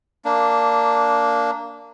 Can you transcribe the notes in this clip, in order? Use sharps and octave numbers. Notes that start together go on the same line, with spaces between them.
A#3 D4